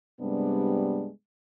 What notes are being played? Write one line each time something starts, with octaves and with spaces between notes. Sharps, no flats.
G2 C3 G3 G#3 B3 D4